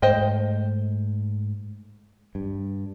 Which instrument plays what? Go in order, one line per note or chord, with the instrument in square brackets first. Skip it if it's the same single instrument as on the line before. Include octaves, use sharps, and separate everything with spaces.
[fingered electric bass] G#2 A3 [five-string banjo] C5 D#5 G5
[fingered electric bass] G2